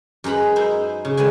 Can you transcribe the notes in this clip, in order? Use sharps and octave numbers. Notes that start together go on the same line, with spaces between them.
F#2 G#3 B4 A#5 B5
D#4 E4 C5
C#3
D3 D#3 G#3 B4 G#5